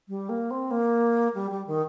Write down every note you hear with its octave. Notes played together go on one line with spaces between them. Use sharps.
G3
A#3
C4
A#3
G3
G3
D#3